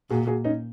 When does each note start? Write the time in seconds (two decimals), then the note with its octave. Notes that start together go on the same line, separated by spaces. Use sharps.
0.10 A#2 F#4 G#4
0.27 F#4 G#4
0.44 C#4 D#4